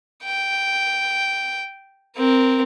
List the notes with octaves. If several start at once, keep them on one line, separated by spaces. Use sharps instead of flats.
G5
C4 A#4